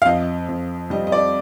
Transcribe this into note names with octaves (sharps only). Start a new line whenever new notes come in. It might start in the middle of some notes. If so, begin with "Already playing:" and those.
F5
F2 D#5
F2
G3 D#5
D#5
D5